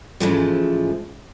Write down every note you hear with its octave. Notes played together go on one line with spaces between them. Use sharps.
G#2 C#3 E3 F3 G#3 A3